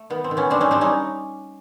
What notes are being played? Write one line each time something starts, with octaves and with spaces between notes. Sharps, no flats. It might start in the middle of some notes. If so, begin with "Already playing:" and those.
Already playing: A3
D#3 B3
C4
D#3
B3 C#4
G3 C4 D4
C#4 D#4
G3 C4 D4
C#4 D#4